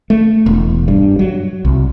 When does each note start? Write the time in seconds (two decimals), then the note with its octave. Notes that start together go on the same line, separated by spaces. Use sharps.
0.10 A3
0.46 E1
0.88 G2
1.19 F#3
1.65 C2